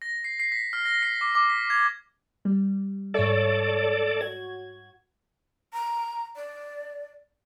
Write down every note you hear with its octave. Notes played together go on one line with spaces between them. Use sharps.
A#6
C7
C7
B6
F6
A#6
C7
D6
D6
B6
G#6
G3
G#2 A4 C#5 D5 E5
F#4 G#6
A#5
D5